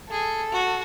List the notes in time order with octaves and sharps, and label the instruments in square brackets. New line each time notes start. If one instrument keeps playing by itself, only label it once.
[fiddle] G#4 [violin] A4
[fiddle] F#4